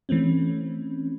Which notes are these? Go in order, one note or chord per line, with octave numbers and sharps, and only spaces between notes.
E3 A3 C4 C#4